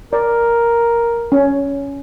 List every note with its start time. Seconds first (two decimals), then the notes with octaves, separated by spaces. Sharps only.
0.13 A#4 D5
1.32 C#4